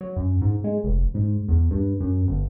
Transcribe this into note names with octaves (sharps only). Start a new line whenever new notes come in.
F#3
F#2
G#2
G#3
F1
G#2
E2
G2
F#2
G1